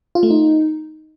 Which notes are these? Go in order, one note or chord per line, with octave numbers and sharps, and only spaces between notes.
F4
A3
D#4